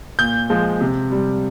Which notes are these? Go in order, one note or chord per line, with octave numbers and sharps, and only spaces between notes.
A#2 G6
F3 G#3
C3
G3